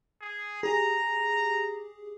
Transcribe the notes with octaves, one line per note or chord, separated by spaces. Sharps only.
G#4
G4 G#4 A#5